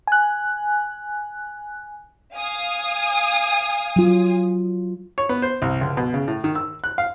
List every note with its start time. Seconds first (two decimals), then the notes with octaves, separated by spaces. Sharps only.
0.07 G#5 F#6
2.34 F5 G#5 D#6
3.96 F#3 F4
5.18 C#5
5.29 B3
5.42 C5
5.62 C2
5.81 C#2
5.97 B2
6.14 C#3
6.28 A2
6.44 D#3
6.55 E6
6.84 F#6
6.98 F5